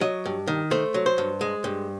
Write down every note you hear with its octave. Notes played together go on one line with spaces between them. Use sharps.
F#3 D#5
G2
D#3
A3 C5
F#3
C5
G2
G#3
G2